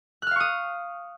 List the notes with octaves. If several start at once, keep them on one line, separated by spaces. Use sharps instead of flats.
F5 C#6 D#6 F6 F#6